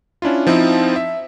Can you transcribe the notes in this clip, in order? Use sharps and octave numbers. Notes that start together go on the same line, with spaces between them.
C#4 D4 E4 F4
F3 C4 D#4 E4
E5